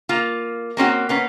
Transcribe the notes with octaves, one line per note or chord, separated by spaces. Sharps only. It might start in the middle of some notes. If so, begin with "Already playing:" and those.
A#3 F4
A#3 C4 C#4 F#4
A#3 B3 C#4